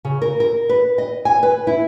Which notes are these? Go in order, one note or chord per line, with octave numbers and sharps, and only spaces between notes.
C#3
A#4
A#4
B4
D#5
G#5
B4
E4